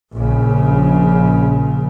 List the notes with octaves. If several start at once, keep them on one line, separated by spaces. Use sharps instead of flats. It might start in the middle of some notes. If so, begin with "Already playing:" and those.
A#1 C#3